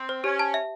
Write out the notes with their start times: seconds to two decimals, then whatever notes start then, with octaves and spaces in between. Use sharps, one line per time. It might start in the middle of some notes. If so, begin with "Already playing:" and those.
Already playing: C4
0.09 C5
0.24 C#4 G4
0.39 A5
0.54 E5